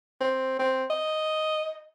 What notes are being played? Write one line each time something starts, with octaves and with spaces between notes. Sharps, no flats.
C4
C4
D#5